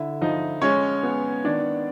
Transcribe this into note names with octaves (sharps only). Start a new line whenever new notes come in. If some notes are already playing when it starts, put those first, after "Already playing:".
Already playing: D3 E4 E5
F3 D#4 D#5
G#3 C#4 C#5
B3
D#3 D4 D5